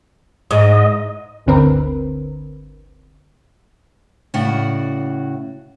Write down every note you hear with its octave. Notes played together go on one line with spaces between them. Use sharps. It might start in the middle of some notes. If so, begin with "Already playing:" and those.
G#2 D#5
G1 D2 D3 C4 A#4 B4
A2 C#3 F#4 D5 F#5